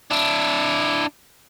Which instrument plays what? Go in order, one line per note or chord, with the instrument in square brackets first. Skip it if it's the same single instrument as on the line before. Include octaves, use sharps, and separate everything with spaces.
[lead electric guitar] D4 E4